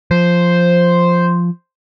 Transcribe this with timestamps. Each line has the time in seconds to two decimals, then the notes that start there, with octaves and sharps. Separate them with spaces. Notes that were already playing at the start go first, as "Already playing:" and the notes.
0.11 F3 C5